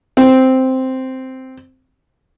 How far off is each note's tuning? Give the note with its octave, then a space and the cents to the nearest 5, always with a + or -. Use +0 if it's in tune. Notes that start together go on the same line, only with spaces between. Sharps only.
C4 -5